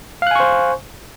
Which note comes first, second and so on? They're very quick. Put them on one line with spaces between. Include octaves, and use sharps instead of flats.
F5 F#6 G#5 C#6 C5